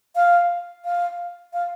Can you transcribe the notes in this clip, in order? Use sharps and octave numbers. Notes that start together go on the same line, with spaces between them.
F5
F5
F5